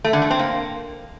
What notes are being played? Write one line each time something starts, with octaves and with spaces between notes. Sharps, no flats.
A3
D3
A3
C4
A#3